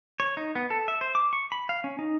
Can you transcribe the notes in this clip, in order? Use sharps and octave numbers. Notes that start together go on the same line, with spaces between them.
C#5
D#4
B3
A4
E5
C5
D6
C#6
B5
F5
C#4
D#4